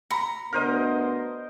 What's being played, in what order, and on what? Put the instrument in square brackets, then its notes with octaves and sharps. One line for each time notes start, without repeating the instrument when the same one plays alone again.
[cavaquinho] A#5 [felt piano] B5 C#7
[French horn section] D2 B3 D4 [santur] A#4 C5 D#5 [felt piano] F6 D#7